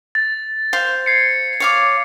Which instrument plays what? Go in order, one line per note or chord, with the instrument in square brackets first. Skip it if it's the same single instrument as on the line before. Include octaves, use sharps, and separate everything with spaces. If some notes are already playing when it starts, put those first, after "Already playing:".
[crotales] A6
[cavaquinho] C5 F5
[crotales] G#6 C7 C#7
[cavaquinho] C#5 F5 D6